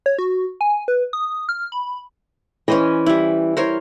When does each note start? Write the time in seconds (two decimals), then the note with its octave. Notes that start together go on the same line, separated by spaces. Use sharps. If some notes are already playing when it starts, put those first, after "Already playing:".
0.06 C#5
0.18 F#4
0.61 G#5
0.88 B4
1.13 D#6
1.49 F6
1.72 B5
2.68 E3 C#4 C5 D#5
3.06 G3 E4
3.57 A#4 C5 C#5